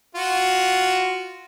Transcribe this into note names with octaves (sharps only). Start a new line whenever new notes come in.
F4 F#4